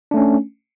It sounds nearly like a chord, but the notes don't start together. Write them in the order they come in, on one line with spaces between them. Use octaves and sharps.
D4 A3 C#4